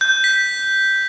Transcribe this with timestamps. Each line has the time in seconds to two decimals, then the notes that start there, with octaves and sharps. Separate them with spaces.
0.01 G6
0.24 B6